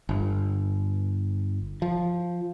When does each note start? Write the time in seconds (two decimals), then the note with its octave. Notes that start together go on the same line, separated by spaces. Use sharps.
0.09 G1
1.82 F3